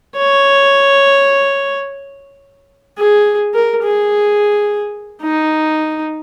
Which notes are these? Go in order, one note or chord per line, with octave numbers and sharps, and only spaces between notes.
C#5
G#4
A#4
G#4
D#4